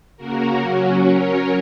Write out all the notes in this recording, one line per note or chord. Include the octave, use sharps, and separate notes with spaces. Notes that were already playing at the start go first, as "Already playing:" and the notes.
C#3 A#3 F#4 A#4
F#3 C#4 F#4
F#3 C#4 A#4 C#5